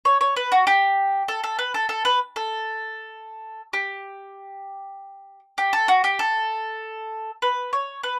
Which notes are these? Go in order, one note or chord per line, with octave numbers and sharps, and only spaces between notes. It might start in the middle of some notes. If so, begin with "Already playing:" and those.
C#5
C#5
B4
F#4
G4
A4
A4
B4
A4
A4
B4
A4
G4
G4
A4
F#4
G4
A4
B4
C#5
B4